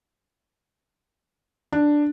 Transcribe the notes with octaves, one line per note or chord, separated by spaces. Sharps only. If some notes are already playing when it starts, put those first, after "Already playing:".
D4